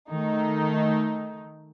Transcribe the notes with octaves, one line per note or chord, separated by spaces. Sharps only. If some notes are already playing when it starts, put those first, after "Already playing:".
D#3 A3 D#4